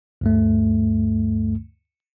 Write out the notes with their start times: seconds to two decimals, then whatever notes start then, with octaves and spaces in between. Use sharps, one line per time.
0.21 D2 G2 A3